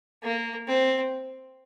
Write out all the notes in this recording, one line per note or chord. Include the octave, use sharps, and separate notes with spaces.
A#3
C4